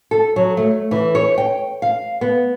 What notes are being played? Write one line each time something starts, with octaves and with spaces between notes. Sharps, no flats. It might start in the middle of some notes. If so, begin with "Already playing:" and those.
A4
F#3
A3
E3
C#5
G5
F5
B3